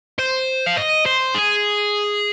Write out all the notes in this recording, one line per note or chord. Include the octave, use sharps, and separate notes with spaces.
C5
F5
D#5
C5
G#4